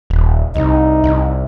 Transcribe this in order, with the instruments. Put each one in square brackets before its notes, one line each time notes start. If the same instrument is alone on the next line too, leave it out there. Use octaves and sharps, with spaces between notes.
[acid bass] D#1
[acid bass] C2 [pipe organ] D#4
[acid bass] C2